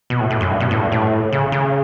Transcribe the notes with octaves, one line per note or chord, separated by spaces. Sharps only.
B2
A2
A2
F#2
G2
B2
A2
G2
A2
C#3
C#3